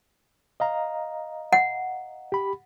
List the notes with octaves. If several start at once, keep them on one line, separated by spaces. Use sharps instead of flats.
D#5 F5 A#5
F#5
G4 B5